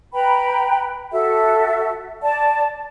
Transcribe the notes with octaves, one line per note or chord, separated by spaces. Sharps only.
B4 G5 A#5 B5
F#4 A4 E5
D5 A5